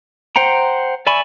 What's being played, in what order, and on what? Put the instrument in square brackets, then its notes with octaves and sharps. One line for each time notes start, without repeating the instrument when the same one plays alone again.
[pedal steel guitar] C5 F#5 G5 A#5
D5 E5 G#5 B5 C#6